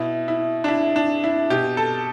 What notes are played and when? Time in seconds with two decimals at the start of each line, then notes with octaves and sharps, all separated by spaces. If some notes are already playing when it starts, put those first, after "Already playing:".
Already playing: B2 E4
0.28 E4
0.64 D4
0.68 E4
0.96 D4
1.24 E4
1.50 B2 G4
1.77 A4